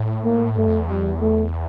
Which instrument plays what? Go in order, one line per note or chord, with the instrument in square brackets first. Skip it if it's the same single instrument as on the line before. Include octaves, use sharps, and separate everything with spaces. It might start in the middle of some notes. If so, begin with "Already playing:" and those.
Already playing: [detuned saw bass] A2
[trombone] A#3
[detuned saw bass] G2 [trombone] A3
[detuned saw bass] F2
E2
[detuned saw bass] F2 [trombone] G3
[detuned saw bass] E2
[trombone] A3